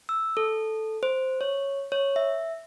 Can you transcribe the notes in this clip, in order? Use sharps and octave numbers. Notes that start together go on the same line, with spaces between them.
E6
A4
C5
C#5
C#5
E5